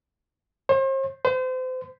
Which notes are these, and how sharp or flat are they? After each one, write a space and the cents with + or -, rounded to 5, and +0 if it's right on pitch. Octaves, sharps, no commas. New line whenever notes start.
C5 +40
C5 -35